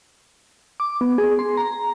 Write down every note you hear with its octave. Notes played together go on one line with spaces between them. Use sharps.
D6
B3
G#4
C6
A#5